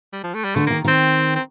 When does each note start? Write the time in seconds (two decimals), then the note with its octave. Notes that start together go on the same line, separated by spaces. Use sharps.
0.13 G3
0.23 F3
0.34 A3
0.44 G3
0.55 D3 A3
0.67 D#3 A#3
0.84 D#3 C4
1.35 C4